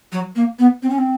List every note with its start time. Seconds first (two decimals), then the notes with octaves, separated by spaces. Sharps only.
0.12 F#3
0.36 A#3
0.59 B3
0.83 C4
0.90 C#4
0.98 C4